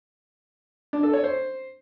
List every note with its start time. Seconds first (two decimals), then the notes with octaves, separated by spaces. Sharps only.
0.93 D4
1.03 A4
1.13 C#5
1.24 C5